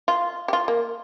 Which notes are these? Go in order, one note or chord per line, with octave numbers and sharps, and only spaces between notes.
F4
G4
F4
A#3